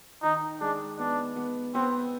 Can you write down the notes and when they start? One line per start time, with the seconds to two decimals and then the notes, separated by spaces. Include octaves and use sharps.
0.22 D#3 D#4
0.60 G#3 D4
0.98 B3 D4
1.36 B3
1.74 B3 C4